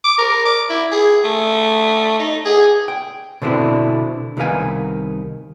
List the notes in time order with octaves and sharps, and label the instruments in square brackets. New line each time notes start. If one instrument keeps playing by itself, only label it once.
[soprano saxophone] D6
A#4
D6
E4
G#4
A3
D#4
G#4
[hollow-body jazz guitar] G5
B2 D3 C4 D4 E4
C2 D#3 B3 D#4 F5 G#5